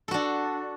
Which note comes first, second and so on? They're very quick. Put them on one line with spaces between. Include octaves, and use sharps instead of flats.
A4 F#4 D4